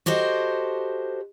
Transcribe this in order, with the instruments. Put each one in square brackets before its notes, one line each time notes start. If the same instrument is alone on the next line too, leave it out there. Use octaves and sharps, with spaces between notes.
[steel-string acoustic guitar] F#4 G4 A4 C5 D#5